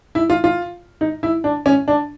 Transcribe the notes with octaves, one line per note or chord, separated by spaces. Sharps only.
E4
F4
F4
D#4
E4
D4
C#4
D4